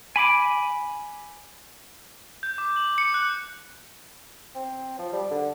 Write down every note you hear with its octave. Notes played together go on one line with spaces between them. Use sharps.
G#5 B5 D6
G6
D6
F#7
C#7
F#6
C4
F3
G3
D3